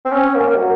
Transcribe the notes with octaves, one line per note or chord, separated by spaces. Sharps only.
C4
C#4
A#3
F#3